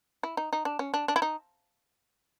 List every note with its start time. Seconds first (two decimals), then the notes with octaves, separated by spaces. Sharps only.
0.23 E4
0.37 D#4
0.53 D#4
0.65 D4
0.79 C#4
0.94 D4
1.08 D4
1.16 E4
1.22 D#4